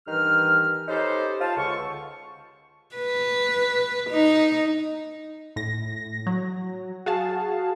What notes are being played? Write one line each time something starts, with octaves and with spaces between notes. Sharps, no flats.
G2 D#3 E3 D#4 F6
C#4 D#4 G4 A4 B4 C5
F4 C5 F5 A5
C#2 D3 C#6
B4
D#4
A2 A#6
F#3
F#4 G#4 F5 A5